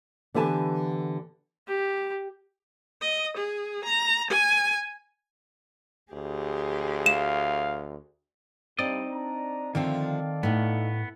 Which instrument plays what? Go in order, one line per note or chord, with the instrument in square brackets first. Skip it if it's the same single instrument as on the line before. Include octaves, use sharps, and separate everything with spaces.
[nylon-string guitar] D3 E3 B3 G4 G#5 A5
[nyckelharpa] G4
[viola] D#5
G#4
A#5
G#5
[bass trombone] D2 [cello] G4 G#4
[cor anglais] F5 [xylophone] E7
[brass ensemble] G2 [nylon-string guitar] C4 D#4 [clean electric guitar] D5 D#5
[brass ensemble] D4 A#5
[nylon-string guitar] D3 F3 A3 [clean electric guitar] D#3 C4 [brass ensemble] A4 D5 F5
[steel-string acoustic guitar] A2 [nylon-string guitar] A3 D#4 [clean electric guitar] B3